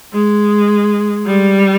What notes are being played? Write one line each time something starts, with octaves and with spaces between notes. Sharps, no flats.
G#3
G3